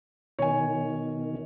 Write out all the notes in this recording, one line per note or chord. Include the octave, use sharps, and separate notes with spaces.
B2 D#3 C#5 G#5